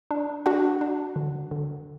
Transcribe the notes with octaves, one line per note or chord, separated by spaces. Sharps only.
D4
D4 F#4 F#5
D4
D3
D3